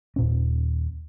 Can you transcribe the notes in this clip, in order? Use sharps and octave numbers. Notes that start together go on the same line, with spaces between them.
D#2 A#2 C#4